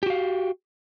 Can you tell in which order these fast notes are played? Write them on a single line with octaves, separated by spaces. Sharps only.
G4 F#4 F5